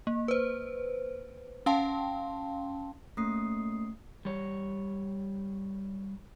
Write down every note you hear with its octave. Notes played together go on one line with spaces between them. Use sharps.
A#3
B4 C5
C#4 F5 G5 A5 C6
A3 A#3 C#4 D#6 C7
G3 C#5